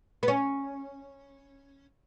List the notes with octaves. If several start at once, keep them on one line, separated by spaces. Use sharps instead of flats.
B3
C#4